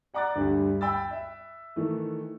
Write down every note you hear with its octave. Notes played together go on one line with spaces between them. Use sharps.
D5 F#5 A#5 D6 F#6 A6
D2 G2 G3
G5 B5 E6 A6
E5
D#3 E3 A3